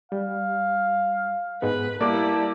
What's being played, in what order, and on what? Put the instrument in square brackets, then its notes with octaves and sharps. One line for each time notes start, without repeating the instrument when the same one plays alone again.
[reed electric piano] G3 [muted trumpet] F5
[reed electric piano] G#2 G#3 B3 [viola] B4
[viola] G3 E4 [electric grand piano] A#3 G4 D6 [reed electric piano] D5 [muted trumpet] A5